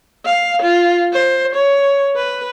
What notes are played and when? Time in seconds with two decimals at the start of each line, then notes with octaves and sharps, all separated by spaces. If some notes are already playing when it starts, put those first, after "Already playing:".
0.25 F5
0.62 F4
1.12 C5
1.54 C#5
2.16 B4